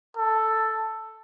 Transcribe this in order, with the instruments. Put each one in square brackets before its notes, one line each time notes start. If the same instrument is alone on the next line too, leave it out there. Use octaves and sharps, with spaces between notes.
[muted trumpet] A4